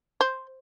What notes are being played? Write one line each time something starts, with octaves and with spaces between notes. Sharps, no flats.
C5